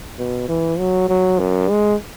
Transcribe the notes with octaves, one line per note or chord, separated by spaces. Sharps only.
B2
E3
F#3
F#3
F#2
G#3